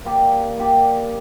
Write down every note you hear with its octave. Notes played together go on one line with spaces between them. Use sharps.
A#3 G4 D5
A#3 G4 D5